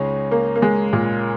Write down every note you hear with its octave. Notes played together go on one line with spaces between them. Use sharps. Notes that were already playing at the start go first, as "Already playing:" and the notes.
Already playing: C#2 C#3 G#3 C#4 D#4 G#4
A#3
A#3
G#3
A#2